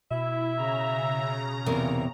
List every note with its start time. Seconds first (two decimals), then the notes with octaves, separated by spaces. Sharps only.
0.11 B2 E4 E5
0.57 C#3 A#5
1.66 E2 C3 A#3